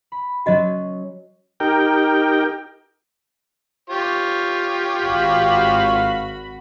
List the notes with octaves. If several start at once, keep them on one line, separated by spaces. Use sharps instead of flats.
B5
F#3 C#4 F#4 D#5
D#4 G4 A#4 G5
F4 G4 C#5
G#1 F#4 F5 B5